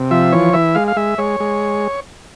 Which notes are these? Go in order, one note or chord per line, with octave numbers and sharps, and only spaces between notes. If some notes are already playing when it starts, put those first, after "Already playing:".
Already playing: C3
F3 E5
E3 C#5
E3 E5
G#3 F5
F5
G#3 E5
G#3 C#5
G#3